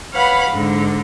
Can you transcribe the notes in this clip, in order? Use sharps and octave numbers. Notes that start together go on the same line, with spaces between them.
B4 C#5 F5 F#5 B5
G#2 D3